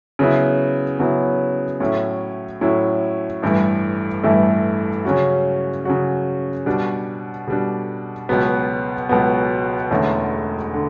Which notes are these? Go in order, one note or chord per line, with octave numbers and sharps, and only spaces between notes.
C#3 F#3 B3 E4
C#3 F#3 B3 E4
A2 F#3 C#4 E4
A2 F#3 C#4 E4
A1 G2 E3 A3 E4
A1 G2 E3 A3 E4
C#3 F#3 C#4 F#4
C#3 F#3 C#4 F#4
B2 G3 D4
B2 G3 D4
C#2 B2 F#3 B3
C#2 B2 F#3 B3
E1 E2 D3 A3 C#4
D3